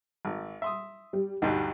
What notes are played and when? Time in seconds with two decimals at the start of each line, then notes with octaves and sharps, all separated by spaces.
0.25 G#1
0.62 E5 C6 D#6
1.13 G3
1.42 D2 G2 G3 D#4